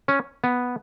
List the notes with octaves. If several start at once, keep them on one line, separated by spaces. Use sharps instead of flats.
C#4
B3